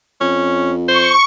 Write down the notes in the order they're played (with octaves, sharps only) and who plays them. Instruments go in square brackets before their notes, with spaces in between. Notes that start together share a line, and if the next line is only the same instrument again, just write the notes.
[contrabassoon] F2 [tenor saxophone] C#4
[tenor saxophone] C5 [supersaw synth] C#6